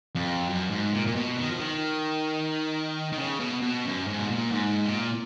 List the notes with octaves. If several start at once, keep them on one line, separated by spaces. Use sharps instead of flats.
F2
F#2
G#2
A#2
A#2
B2
D#3
F3
D#3
D#3
C#3
B2
B2
F#2
G#2
B2
A#2
G#2
A#2